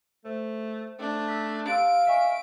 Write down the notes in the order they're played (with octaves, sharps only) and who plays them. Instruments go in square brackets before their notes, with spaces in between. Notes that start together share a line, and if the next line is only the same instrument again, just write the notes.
[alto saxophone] A3 [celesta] C5
[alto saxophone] A3 [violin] D4
[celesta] E6 B6
[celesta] G4 C6 E6 [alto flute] F5 [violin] D7
[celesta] D#5 G#5 C#6 [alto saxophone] E5